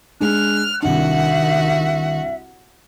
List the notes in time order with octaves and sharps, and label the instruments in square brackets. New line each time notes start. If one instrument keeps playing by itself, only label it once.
[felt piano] G#3 D4 [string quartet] F6 [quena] F#6
[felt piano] C2 D4 [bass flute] D#3 [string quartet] F#4 F#5 [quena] E5